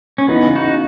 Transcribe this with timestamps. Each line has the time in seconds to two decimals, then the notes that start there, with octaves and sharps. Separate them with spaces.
0.18 C#4
0.28 E3 B3 D#4
0.47 C#3
0.55 D#4 F#4
0.64 C#3